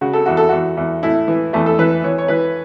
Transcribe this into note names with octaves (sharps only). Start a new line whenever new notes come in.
C#3 F#4
A4
E2 F#4
A4
E2 F#4
E2
A2 E4
E3
E2 A3
A4
E3 B4
E3 C#5
C#5
E3 B4